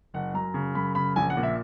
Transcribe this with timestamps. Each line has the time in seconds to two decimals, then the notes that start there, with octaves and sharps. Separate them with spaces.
0.14 F#1 F#5
0.34 F#2 A#5
0.54 C#3
0.75 F#2 B5
0.95 C#3 B5
1.16 A#1 G#5
1.30 F#5
1.37 A#2
1.43 E5